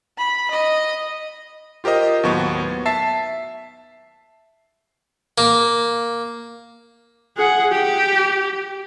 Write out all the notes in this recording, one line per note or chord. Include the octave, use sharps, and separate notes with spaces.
B5
D#5
F4 G4 A#4 C5 D#5
D#2 A2 F#3 B3 C#6
E5 A5 A6 C7
A#3
G#4 F#5
G4